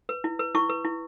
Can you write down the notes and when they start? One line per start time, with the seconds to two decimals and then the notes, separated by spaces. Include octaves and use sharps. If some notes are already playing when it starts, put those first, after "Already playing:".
0.09 B4
0.24 E4
0.39 B4
0.55 E4 C#6
0.70 B4
0.85 E4